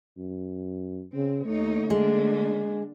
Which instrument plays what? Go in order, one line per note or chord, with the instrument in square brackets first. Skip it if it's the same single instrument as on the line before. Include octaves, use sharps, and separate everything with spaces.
[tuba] F#2
[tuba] C#3 [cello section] C4
[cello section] D#2 D#4 C#5 [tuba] A3
[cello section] D3 A#3 D4 [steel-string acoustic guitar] G#3